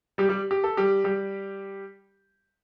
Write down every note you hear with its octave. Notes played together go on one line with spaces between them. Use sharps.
G3 G4
G3 G4
G4
A4
G3 G4
G3 G4